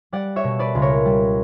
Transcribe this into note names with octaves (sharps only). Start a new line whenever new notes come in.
G3 D5 F#5
C#5 E5
B2
B4 D5
C#2
A#4 C#5
G3